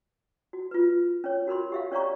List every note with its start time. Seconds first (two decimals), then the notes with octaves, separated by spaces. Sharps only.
0.53 F#4
0.71 F4 B4
1.24 C#4 C#5
1.47 F#4 A#4 B5 C6
1.72 G4 E5 F5
1.92 C#4 C#5 D5 F5 A#5 C#6